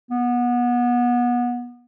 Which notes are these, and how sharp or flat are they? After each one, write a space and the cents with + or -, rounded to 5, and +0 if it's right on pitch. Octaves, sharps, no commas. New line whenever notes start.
B3 -25